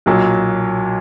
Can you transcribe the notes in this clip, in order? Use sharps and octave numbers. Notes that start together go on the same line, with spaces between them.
B1 A#2 F#3